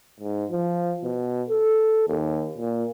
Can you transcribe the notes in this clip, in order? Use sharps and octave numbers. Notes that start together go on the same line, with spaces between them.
G#2
F3
B2
A4
D#2
A#2